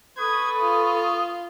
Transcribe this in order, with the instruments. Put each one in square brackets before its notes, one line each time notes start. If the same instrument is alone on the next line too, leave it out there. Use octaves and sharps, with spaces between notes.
[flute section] A4 C#6 [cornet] B4 [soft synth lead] D#6 [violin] G#6
[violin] F4